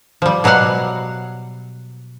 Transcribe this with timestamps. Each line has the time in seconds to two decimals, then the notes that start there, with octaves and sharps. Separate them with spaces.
0.22 F3 G3
0.44 B2 F#3 G3 F5 F#5